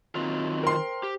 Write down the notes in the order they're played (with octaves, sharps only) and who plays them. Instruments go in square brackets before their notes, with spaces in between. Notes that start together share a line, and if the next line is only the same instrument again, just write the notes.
[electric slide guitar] D#3 F#3 F4 [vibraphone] C4
[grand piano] A#4 C6 [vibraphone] C5 G5
[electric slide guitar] G4